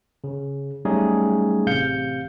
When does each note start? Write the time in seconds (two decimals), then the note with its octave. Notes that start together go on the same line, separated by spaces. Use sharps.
0.24 C#3
0.85 F#3 G3 A3 C#4 D#4 G#4
1.66 A1 C3 F5 G6 C#7